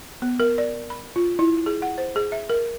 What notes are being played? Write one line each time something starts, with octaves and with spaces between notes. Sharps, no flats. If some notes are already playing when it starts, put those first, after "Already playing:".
B3
A#4
D5
B5
F4
E4
G#4
F#5
C5
G#4
E5
A#4